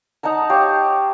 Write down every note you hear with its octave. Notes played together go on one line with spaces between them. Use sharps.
D#4 F#5 A5 A#5
G4 C#5 F5